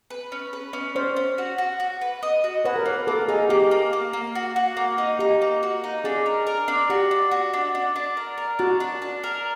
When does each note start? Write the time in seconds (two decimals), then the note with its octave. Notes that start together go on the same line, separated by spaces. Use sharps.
0.10 B4
0.32 C#4
0.53 B4
0.73 C#4
0.95 C#4 C5 D5
1.16 C#4
1.38 F#4
1.58 F#4
1.80 F#4
2.01 B4
2.23 D#5
2.44 F#4
2.65 F#4 B4 C#5
2.76 A#4
2.86 A#3 B4
3.07 A#3 A4
3.28 D#4 G#4
3.49 A#3 G4
3.71 A#3
3.93 A#3
4.13 A#3
4.35 F#4
4.56 F#4
4.77 A#3
4.98 D#4
5.19 D#4 G4
5.42 A#3
5.63 F#4
5.84 D#4
6.04 D4 G#4
6.26 A#4
6.47 A#4
6.68 D4
6.90 F#4 G4
7.11 D4
7.31 F#4
7.53 D4
7.75 D4
7.96 D4
8.17 A#4
8.38 A#4
8.59 D4 F#4
8.80 D4
9.02 D4
9.24 A#4